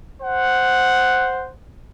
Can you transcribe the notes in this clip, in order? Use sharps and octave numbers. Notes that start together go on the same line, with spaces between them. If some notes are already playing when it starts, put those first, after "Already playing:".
C5 F#5